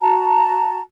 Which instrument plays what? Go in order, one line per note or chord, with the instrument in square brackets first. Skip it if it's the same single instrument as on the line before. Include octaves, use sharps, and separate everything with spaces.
[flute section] F#4 A5 A#5